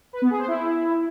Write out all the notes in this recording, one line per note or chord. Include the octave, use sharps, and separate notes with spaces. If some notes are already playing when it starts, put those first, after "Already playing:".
B4
B3
G#4
C5
E4